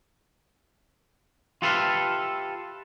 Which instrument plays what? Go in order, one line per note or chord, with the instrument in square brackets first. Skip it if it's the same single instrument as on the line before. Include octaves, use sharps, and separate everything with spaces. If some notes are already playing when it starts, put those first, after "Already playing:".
[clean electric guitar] F4 G4 A4 B4 E5 F5